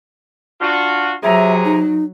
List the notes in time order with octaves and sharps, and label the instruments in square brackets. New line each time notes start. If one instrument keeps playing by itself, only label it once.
[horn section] D4 F4 F#4
[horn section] C3 G#4 A#5 [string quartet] F#3 [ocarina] E5
[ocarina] D#4